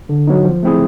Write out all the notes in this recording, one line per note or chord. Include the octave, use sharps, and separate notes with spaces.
D3
F#3 B3 D#4
F3
A3 C4 E4 G#4